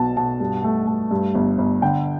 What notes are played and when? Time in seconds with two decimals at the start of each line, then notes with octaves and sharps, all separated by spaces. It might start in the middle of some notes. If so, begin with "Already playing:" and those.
Already playing: B1 B2 A5
0.16 B2 A5
0.40 G2
0.64 A3
0.87 A3
1.11 G2
1.35 G1
1.58 G1
1.82 D3 G5